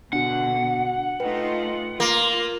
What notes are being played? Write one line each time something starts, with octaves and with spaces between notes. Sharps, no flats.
B2 D3 D4 F#4 F#5
A3 D#4 F4 B4 G5
A#3 F4